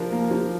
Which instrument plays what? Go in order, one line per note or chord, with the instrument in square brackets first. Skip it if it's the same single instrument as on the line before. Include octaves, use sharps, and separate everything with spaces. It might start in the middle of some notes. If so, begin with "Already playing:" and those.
Already playing: [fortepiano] F3 D4 A#4
A#3
F3